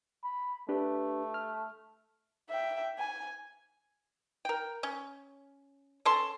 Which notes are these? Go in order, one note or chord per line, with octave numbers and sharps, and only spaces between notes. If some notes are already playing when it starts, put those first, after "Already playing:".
B5
A3 D4 G4 B4
F6
E5 G5
G#5
A#4 G5
C#4
C#4 A4 A5 C6